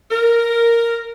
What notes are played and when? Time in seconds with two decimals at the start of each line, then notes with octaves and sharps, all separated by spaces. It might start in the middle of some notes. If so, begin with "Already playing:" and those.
0.11 A#4